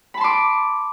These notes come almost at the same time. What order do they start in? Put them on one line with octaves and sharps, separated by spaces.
B5 A5 C6 D6